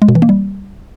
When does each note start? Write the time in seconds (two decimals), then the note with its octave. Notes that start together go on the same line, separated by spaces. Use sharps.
0.02 G#3
0.08 B2
0.15 E3
0.22 A#3
0.29 G3